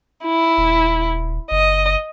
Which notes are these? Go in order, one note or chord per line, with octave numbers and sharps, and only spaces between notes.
E4
D#1
F#1 D#5